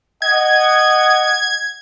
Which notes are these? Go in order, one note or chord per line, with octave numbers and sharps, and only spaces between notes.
D#5 F#5 G#6